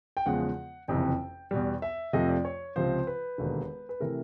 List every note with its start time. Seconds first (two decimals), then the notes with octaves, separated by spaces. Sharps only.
0.17 G5
0.26 E2 C#3 F3 G#3 F#5
0.88 F#1 F2 C3 E3 G5
1.51 E2 B2 G3
1.82 E5
2.13 F2 C3 F3 A3 D#5
2.29 D5
2.45 C#5
2.76 C#2 C3 F3 C5
3.07 B4
3.38 E1 D#2 D3
3.89 B4
4.00 C3 E3 A3 A#4